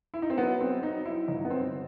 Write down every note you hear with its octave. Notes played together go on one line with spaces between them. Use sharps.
E4
D#4
C4
F#3 B3
C4
F#3 D#4
E4
G1 D#4
B3
C4